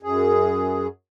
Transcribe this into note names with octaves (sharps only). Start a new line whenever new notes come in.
F#2 G#4